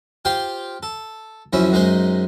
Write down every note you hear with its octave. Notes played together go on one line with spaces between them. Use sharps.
F4 G4 C5 F5 G5
A4
F#2 F3 C#4 E4
F#2 G#3 D#4 C5